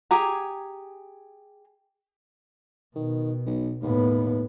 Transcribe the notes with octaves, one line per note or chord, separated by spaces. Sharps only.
G4 G#4 G#5 A#5
B2 D#3
B1
D#2 A2 B3